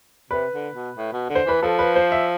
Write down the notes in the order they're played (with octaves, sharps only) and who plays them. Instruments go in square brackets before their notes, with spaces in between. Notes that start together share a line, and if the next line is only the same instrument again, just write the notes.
[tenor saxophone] C3 [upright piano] B4
[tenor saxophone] D3
B2
A2
B2
D3
[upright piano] C5
[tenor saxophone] E3 [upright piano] B4
[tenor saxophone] F3 [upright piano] A4
[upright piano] B4
C5
E5